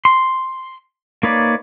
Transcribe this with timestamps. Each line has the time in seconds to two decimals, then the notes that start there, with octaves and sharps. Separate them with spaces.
0.05 C6
1.23 A#3 D#4 B4 C#5 D5